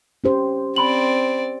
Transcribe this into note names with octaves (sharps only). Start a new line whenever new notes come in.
C#4 G4 C5
C4 D5 B5 C6 F#7